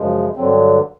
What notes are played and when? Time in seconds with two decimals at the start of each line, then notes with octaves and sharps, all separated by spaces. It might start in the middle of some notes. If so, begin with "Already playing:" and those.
Already playing: F#2 C#3 F3 G#3
0.36 G2 D3 F#3 C4